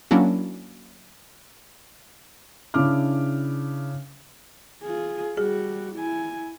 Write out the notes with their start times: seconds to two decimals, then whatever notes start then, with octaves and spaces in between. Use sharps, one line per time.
0.11 F#3 A#3 C#4 D4 E4 F#4
2.74 C#3 D4 E4 D6 F6
4.83 F4 G#4
5.37 G3 F#4 G#4
5.95 E4 G#5